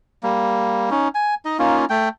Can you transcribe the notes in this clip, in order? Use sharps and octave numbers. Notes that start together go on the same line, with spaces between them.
G3 A#3
C#4 D#4
G#5
D#4 D#5
A#3 C#4 D#4 F4
A3 G5